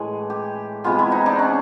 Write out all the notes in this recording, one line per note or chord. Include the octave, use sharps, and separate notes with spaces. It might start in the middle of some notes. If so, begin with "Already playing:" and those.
Already playing: A2 E3 G#3 G#4
G4
C3 E3 G#3 B3 F4
E4
D#4
D4
C#4